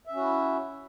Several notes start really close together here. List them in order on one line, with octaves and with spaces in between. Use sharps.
E5 C#4 F#4 E4